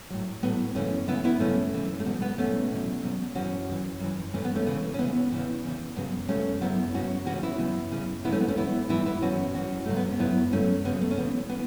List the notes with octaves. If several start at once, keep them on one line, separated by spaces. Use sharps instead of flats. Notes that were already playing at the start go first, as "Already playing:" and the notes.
A2 F#3
A2 F#3 B3
F#2 C#3 E3 A3 C#4
F#2 C#3 E3 B3 E4
B3 E4
F#2 C#3 E3 A3 C#4
F#2 C#3 E3
A3
E2 B2 F#3 B3
B3
E2 B2 F#3 A3 C#4
E2 B2 F#3
E2 B2 F#3
F#2 E3 C#4 F#4
F#2 E3
F#2 E3
F#2 E3 A3 C#4
B3
A3 C#4
E2 C#3 E3
C#4
E2 C#3 E3 B3
E2 C#3 E3
E2 C#3 E3
F#2 C#3 F#3 B3
F#2 C#3 F#3 A3 C#4
F#2 C#3 F#3 B3 E4
F#2 C#3 F#3 C#4 F#4
F#2 C#3 E3 C#4 F#4
B3 E4
F#2 C#3 E3
F#2 C#3 E3
F#2 C#3 E3 B3 E4
A3 C#4
B3
A3 C#4
F#2 E3 B3 E4
F#2 E3 B3 E4
B3 E4
F#2 E3 C#4 F#4
F#2 E3 C#4 F#4
F#2 C#3 F#3 A3
B3
C#4
F#2 C#3 F#3 B3 E4
F#2 C#3 F#3 A3 C#4
F#2 C#3 F#3 B3
A3
C#4
E2 C#3 E3 B3
E3 B3